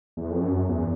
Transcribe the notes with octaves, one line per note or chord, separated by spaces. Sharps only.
E2
F2
F#2
E2